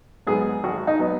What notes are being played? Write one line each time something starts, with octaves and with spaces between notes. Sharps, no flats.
G#2 F#3 B3 G#4
G#1 F#4
D#4
F#3 B3